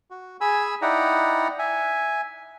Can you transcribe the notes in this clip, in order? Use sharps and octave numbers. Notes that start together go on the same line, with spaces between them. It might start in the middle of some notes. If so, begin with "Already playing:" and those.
F#4
G#4 G#5 B5 E6
D#4 E4 D5 F#5 G5 A#5
E5 G#5